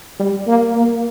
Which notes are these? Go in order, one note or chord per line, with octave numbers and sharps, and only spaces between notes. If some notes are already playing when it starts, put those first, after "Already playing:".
G3
A#3
A#3